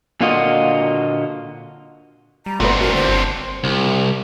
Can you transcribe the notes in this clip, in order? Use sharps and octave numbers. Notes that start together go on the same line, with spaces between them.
A#2 D3 A#3 F4 F#4 D#5
G3 A#5
G1 A#2 A3 B3 C4 D4
F#4 A#4
D3 C5
G1
C2